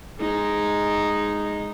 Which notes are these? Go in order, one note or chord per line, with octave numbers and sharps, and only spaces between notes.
G#3 D#4